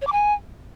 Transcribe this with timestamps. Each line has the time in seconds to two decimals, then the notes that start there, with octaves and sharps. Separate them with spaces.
0.01 C#5
0.07 D6
0.12 G#5